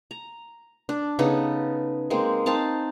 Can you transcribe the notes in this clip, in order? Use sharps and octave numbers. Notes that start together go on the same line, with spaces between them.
A#5
D4
C#3 B3 D#4 A4
G#3 A#3 C4
C4 D#4 F5 A5